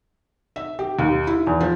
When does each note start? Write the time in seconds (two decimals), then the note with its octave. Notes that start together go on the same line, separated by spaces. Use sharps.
0.56 E5
0.79 G4
0.99 D#2
1.27 E4
1.47 E2
1.61 F3